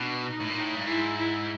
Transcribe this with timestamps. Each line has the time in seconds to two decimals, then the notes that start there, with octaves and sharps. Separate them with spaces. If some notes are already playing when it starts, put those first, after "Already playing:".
Already playing: B2 D4
0.25 D#4
0.40 A2
0.49 A#2
0.56 A2 D#4
0.74 G2
0.86 G#2 E4
1.16 E4